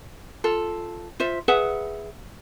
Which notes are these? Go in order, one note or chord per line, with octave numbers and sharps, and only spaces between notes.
F4 A4
F4 C5 E5
G#4 B4 E5 F#5